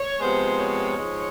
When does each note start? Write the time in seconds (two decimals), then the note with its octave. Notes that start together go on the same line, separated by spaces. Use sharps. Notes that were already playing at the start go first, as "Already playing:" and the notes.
Already playing: C#5
0.19 C3 F3 G#3 B3 C5
0.58 C#5
0.97 G#2 F3 G#3